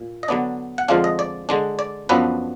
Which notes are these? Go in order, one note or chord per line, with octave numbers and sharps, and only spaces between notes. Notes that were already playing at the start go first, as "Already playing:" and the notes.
Already playing: A#2
D#5
D3 F#3 B3 D4 D5
F#5
F2 D3 F3 G#3 D4 F5
D#5
D5
D3 G#3 D4
D5
F#2 F3 B3 D4 B4